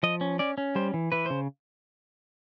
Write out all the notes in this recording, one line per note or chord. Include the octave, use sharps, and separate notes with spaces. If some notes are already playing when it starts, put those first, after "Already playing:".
F3 D#5
C#4
C#4 D5
C#4
G3 C5
E3
E3 B4
C#3 C5